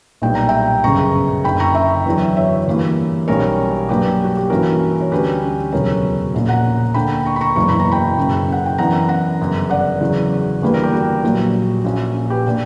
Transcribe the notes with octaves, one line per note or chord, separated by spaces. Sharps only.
B1 A#2 G3 B3 D4 G5
A#5
E5 G5
G1 F#2 C#3 A#5 C#6
F#1 F#2 D3 G5 B5
A#5 C#6
E5 G5
E2 D3 F#3
C#5 E5
G2 E3 A#3
B1 B2 G3 C#4 A#4 C#5
G2 F#3 A#3 D4 G4 B4
F#4
G4
G2 E3 A#3 C#4 F#4 A#4
C#5
D2 D3 G3 C#4 G4 B4
E1 D2 C#3 F#3 B3 A#4 C#5
A#1 A#2 A#3 C#4
F#5 A#5
D2 D3 A#3 G5 B5
A#5 C#6
B5
A#5 C#6
F#1 E2 B2 F#3 A#3 C#6
B5
A#5
G5 B5
F#1 F#2 C#3
F#5
G5
F#2 E3 B3 D4 F#5 A#5
F#5 A#5
G1 F#2 C#3
D5 F#5
E2 C#3 F#3
E2 D3 G3 A#3 B4
A#4
G4
F#4
A#1 A#2 F#3
A#1 A#2 A#3 C#4
G4 B4
B2 A#3 D4